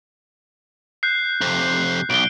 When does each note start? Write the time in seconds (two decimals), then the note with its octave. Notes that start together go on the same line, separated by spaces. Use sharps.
1.03 F#6 G6 C7
1.41 F2 C3
2.10 B1 D7 G7